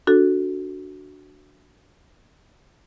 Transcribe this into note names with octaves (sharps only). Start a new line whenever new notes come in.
D4 F#4 A4